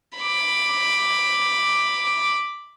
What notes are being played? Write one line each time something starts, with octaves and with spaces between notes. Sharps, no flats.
B5 D6